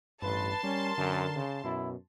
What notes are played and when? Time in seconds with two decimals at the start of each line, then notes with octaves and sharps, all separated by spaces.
0.22 A1 G2 B4 A5 C6
0.63 G3 C#4 A#4
0.98 F#2 D3
1.36 C#3
1.64 F#2 B2 E4